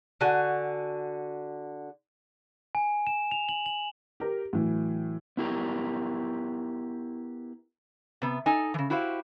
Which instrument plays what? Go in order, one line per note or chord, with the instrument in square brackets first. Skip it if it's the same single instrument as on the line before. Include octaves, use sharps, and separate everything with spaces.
[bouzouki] D3 F#4 G#5
[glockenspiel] G#5
E7
F7
F#7
F#7
[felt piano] G4 A#4
A2 E3 F#3
[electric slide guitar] B3 E4 G4 A#4
[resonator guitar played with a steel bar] C3 B3
D#4 A4 G#5
C#3 E3
E4 F#4 G4 C5 F5